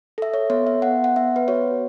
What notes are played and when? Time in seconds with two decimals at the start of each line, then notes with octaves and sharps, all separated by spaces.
0.18 A4 E5
0.34 C#5
0.50 B3 C#5
0.67 E5
0.82 B3 F#5
1.04 F#5
1.16 B3 E5
1.36 B4
1.48 F#4 C#5